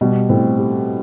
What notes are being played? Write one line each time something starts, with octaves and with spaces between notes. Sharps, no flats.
B2 G3
A2 C4
G4